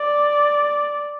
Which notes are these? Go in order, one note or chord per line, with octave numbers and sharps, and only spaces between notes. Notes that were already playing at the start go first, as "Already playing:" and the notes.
Already playing: D5